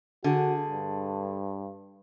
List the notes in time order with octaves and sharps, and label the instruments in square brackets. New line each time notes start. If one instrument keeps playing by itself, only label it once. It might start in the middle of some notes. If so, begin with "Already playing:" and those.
[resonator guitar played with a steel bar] D3 G#4 [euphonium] F#4
[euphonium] G2